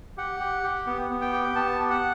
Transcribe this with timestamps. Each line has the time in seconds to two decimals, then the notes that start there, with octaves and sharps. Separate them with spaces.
0.17 G4 F#5
0.40 G4
0.63 G4
0.87 B3
1.10 B3
1.21 G5
1.33 G4
1.44 G5
1.55 B3 A5
1.79 G4
1.90 F#5